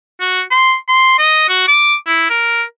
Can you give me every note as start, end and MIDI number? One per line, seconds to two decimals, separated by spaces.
0.21 0.42 66
0.51 0.75 84
0.89 1.15 84
1.19 1.49 75
1.49 1.63 66
1.68 1.95 86
2.07 2.28 64
2.30 2.63 70